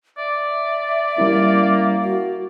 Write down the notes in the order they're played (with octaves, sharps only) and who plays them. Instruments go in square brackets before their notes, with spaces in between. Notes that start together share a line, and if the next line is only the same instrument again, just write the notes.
[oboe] D5 [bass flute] E5
[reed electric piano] G3 C#4 E4 [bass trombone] A#3
[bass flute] F#4